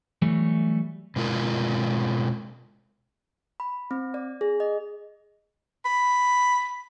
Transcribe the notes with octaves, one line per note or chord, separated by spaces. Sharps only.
E3 F#3 G3 A3
B2 G#3 F4 A#4
B5
C4
D5
G#4
D#5
B5